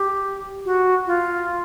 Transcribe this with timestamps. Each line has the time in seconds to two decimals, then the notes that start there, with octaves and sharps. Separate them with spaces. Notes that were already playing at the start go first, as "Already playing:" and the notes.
Already playing: G4
0.65 F#4
1.06 F4